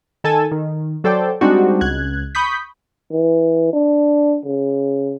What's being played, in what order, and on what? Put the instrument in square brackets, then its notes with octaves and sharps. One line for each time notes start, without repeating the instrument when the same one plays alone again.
[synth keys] D#3 A4 G#5 A5
D#3
F#3 A4 C5 D5 G5
G3 G#3 C4 D4 D#4 F#4
C#2 F#6 G#6
B5 C#6 D#6 G6 B6
[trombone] E3
D4
C#3